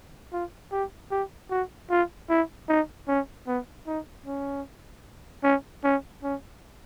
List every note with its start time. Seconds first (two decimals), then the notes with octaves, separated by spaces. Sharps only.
0.32 F4
0.72 G4
1.11 G4
1.50 F#4
1.90 F4
2.30 E4
2.69 D#4
3.08 C#4
3.47 B3
3.87 D#4
4.26 C#4
5.43 C#4
5.84 C#4
6.23 C#4